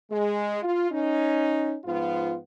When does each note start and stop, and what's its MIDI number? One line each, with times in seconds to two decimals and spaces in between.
0.11 0.61 56
0.63 0.87 65
0.92 1.76 61
0.92 1.76 63
1.85 2.36 44
1.85 2.36 53
1.85 2.36 59
1.85 2.36 65